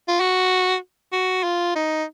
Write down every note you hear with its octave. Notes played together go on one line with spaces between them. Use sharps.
F4
F#4
F#4
F4
D#4